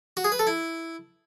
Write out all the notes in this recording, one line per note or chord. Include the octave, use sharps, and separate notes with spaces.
F#4
G#4
B4
A4
E4